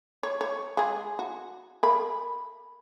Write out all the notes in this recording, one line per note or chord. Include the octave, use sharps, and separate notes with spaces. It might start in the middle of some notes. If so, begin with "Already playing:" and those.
C#5
C#5
G#3 G#4
F#4
A#4 B5